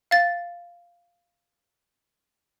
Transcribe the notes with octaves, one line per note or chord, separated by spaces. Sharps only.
F5 A6